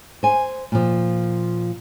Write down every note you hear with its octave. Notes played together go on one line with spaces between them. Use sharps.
C5 G#5
A#2 F3